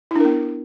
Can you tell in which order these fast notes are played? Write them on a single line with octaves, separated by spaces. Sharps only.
E4 D4 A#4 B3